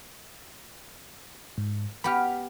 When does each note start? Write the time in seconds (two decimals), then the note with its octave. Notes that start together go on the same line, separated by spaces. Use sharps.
1.58 G#2
2.04 B3 G4 B5 F6